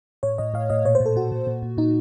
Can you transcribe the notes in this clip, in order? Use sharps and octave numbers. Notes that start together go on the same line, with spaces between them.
A2 C#5
A2 D#5
A2 F5
A2 D#5
A#2 C#5
C5
A#2
A4
A#2 F#4
A#2
A#2
A#2
A#2 D#4